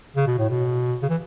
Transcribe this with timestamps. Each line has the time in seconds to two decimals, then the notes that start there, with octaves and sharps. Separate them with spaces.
0.16 C#3
0.27 B2
0.38 A2
0.50 B2
1.02 C#3
1.09 E3